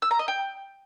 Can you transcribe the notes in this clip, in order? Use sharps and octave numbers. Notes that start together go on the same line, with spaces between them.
E6
A#5
D#5
G5